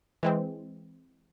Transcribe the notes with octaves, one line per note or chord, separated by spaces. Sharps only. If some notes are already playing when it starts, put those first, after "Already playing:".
E3 G#3 C4